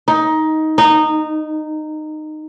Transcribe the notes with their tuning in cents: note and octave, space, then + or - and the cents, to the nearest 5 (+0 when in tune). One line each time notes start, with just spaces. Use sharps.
D#4 +15
D#4 -15